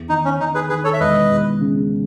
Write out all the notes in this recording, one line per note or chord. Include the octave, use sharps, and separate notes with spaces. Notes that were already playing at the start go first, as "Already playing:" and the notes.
Already playing: E2
D#3 D#4
C#4
D#3 D#4
G#4 B4
D#3 G#4 B4
A4 C#5
E5
E1 B4 D#5
E2
C#3